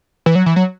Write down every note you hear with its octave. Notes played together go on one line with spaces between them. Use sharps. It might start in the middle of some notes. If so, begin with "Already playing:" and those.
E3
F#3
E3
F#3